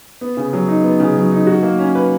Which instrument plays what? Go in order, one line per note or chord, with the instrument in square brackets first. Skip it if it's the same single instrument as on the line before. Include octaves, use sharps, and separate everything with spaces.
[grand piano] B3
C#3
F#3
D#4
B3
C#3
F#3
D#4
F#4
A#3
C#4
B4